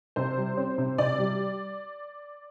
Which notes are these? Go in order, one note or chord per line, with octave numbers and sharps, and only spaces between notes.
C3 C5
G3
C4
C3
C3 D5
G3